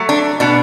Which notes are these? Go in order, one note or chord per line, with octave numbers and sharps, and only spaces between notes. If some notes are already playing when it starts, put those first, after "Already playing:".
Already playing: F#3 A3
D4
B2 D4